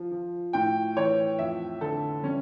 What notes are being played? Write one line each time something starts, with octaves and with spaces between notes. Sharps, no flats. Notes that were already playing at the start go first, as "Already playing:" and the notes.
Already playing: F3
F3
A2 G5
E3 C#5
F2 E5
D3 A4
G3 C#4